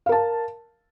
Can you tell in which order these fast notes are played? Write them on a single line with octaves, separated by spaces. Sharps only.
F5 A#4 A5